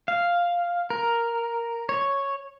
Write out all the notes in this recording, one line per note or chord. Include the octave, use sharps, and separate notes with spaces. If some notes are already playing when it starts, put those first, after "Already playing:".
F5
A#4
C#5